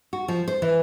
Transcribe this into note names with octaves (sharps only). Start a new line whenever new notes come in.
F#4
F3
C5
E3